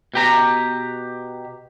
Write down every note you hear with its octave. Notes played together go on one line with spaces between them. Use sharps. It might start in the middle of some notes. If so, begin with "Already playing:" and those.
B2 G4 A#5